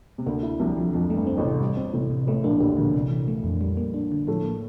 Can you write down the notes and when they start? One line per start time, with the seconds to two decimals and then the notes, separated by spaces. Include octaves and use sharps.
0.18 C3
0.26 D2 D3 A#3
0.43 E4
0.60 C2 C3 F3
0.77 F3
0.93 F2 F3
1.10 A3
1.16 G2
1.27 C4
1.38 A1 A2
1.44 C3
1.60 G3
1.77 C4
1.93 A1 A2 C3
2.11 C3
2.27 A1 A2 A3
2.44 A#1 A#2 D4
2.60 D2 D3 G4
2.77 A#1 A#2 D3
2.94 C3
3.11 E3
3.28 A3
3.44 F2
3.61 G3
3.77 A#3
3.94 D4
4.12 D3
4.27 A2 F3 A3
4.45 A#3